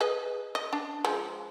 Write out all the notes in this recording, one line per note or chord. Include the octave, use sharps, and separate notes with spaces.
G#4 B4 D#5
D#5
D4
F3 G#3